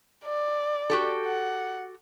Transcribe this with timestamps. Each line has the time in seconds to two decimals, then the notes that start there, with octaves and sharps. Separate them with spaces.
0.25 D5
0.90 F#4 G4 A4
1.26 F#5